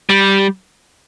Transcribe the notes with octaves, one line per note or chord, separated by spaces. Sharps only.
G3